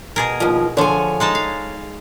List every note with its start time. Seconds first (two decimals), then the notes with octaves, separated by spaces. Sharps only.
0.16 B2 G#4 A#4
0.40 D#2 F3
0.77 D3 F3 C#5 G#5
1.20 G#3 D#4 A5
1.35 F5